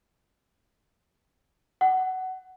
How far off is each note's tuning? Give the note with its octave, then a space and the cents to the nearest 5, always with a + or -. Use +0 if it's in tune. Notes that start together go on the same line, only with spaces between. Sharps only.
F#5 +15